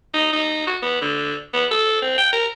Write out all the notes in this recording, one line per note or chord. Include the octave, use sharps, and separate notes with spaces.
D#4
D#4
F#4
B3
D3
B3
A4
C4
G5
A#4